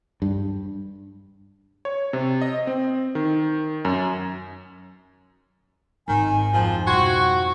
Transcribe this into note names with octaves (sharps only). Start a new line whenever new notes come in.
G2
C#5
C3
D#5
C4
D#3
F#2
G#1 D#3 G#5
F2 G#2 F3
B2 G3 F#4 G5 C6 C#6 G#6